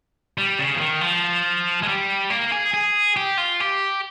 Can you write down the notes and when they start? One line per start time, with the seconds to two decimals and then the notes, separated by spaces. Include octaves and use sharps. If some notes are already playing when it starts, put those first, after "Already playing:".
0.38 G3
0.59 C#3
0.75 F3
0.80 D#3
1.01 F3
1.83 G#3
1.88 G3
2.30 A#3
2.52 G#4
2.74 G#4
3.16 G4
3.38 F4
3.60 G4